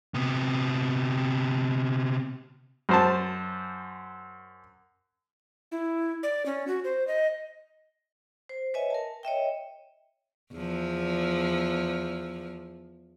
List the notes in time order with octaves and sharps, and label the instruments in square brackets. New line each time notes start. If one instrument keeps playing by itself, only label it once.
[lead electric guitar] C3 B3
[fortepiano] F#2 C5 A5
[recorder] E4
D5
C#4
F#4
C5
D#5
[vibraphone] C5
B4 C#5 D#5 E5 G#5
A#4 A5
C#5 D#5 E5 G5
[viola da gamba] E2 F3